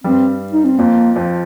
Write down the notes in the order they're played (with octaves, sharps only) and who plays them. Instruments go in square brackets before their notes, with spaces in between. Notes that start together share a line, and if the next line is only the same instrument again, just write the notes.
[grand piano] G2 G3 [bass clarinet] C4
[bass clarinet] D#4
C4
[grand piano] F2 F3 [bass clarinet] A#3
[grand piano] F2 F3